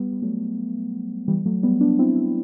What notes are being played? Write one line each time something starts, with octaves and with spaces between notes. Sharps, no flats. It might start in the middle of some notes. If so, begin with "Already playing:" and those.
Already playing: G3 B3
G3
F#3 A3
E3 G3
F#3 A3
G3 B3
B3 D4
C4 E4